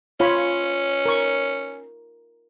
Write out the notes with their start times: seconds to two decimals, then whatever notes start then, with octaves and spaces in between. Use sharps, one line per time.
0.20 C#4 F4 C#5 B5
1.06 A#4 C#6